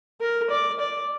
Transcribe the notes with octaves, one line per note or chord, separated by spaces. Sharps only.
A#4
D5
D5